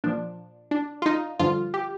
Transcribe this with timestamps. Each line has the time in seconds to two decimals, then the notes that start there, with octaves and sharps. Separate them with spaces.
0.04 A#2 F3 D4
0.71 D4
1.02 F4
1.06 D#4
1.39 G2 D3 F3 F4
1.74 G4